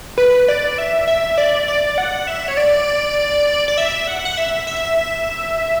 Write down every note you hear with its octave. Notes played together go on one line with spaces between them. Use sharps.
B4
D5
E5
E5
D5
D5
F#5
E5
C#5
D5
D5
E5
F#5
F#5
E5
E5